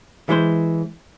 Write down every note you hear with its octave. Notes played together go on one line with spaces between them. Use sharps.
E3 G#3 C5